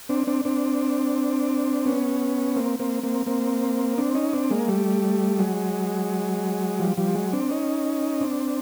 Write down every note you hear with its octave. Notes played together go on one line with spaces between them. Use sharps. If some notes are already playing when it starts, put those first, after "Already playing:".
C4 D4
C4 D4
C4 D4
B3 C#4
A#3 C4
A#3 C4
A#3 C4
A#3 C4
C4 D4
C#4 D#4
C4 D4
G#3 A#3
G3 A3
F#3 G#3
F3 G3
F3 G3
F#3 G#3
C4 D4
C#4 D#4
C4 D4